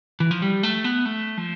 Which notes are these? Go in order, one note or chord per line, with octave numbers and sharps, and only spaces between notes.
E3
F3
G3
A3
B3
A3
F3